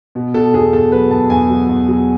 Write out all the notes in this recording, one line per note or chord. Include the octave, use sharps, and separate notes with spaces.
B2
B2 A4
E2 G#4
E2 A4
F#3 B4
E2 A5
E2 G#5
F#3
E2
F#3